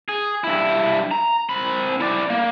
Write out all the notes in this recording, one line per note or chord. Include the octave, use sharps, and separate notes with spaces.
G#4
G2 E4
A#5
C4 B5
E4 D5
A#3